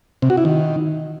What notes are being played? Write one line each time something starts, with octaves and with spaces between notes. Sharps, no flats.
C3
F#4
E4
D#3